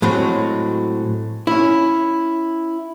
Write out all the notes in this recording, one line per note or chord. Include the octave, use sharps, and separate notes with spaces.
A2 F#3 G#3 C4
C#4 E4